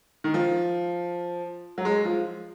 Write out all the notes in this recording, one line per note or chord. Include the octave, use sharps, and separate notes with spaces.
D#3
F3
F#3
G#3
F3